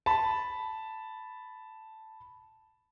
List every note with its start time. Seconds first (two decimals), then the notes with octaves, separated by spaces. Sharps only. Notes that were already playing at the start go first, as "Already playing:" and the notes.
0.06 A5 B5